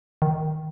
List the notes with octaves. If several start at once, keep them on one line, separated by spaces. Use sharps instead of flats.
D#3